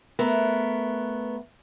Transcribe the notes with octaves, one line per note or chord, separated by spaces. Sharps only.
A3 B3 A#4